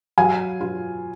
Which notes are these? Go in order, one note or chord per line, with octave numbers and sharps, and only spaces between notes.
F#3 F5 G#5
F4